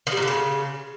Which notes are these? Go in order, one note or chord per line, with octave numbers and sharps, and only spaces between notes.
D#3
G3
A#2
D3
C#3